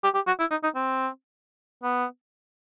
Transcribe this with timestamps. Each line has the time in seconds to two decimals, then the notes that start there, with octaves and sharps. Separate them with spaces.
0.04 G4
0.15 G4
0.27 F#4
0.40 E4
0.51 D#4
0.63 D#4
0.75 C4
1.83 B3